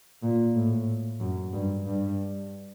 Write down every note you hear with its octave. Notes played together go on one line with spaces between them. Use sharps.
A#2
A2
F#2
G2
G2